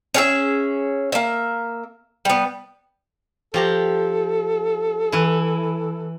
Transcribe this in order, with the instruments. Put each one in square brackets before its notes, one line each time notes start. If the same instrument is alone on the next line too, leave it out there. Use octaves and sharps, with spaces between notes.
[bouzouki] C#4 G#4 E5
A#3 E5
G3 B3
[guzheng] F3 G4 A#5 [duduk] A4
[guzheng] E3 E4